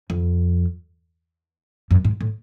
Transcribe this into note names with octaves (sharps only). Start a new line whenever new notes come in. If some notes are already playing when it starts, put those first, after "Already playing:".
F2
F#2
G#2
A2